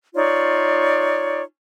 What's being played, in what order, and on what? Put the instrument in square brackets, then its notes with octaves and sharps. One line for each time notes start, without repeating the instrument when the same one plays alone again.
[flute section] D#4 F4 C#5 D5